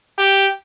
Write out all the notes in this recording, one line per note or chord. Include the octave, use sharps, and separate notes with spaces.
G4